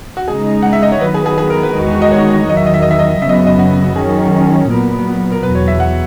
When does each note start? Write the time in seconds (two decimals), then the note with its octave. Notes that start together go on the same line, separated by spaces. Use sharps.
0.17 F#4
0.28 C#3 G#3 D#4 G#4
0.63 F#5
0.73 E5
0.83 D#5
0.92 C#5
1.01 D#3 F#3 B3 B4
1.14 G#4
1.26 G#4
1.38 G#4
1.50 A#4
1.63 B4
1.75 E2 D#3 G#3 D#4 F#4
2.02 D#5
2.12 C#5
2.49 E2 D#3 F#3 D#5
2.57 E5
2.66 D#5
2.74 E5
2.82 D#5
2.91 E5
2.99 D#5
3.22 F#2 C#3 F#3 B3 E5
3.29 D#5
3.34 E5
3.47 D#5
3.59 F#4
3.96 D#3 F#3 C#4 G#4
4.70 A#2 F#3 B3 A#4
5.32 A#4
5.43 E2 B2 F#3 B4
5.55 C#5
5.68 E5
5.80 F#5